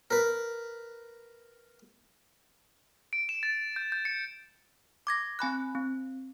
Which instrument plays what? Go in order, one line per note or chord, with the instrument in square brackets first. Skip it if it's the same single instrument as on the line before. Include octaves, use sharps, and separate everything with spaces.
[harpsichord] A#4 B4
[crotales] D7
E7
A6
G6
G6
C#7
[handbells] D6 G#6 A#6
C4 G#5 B5 F#6
C4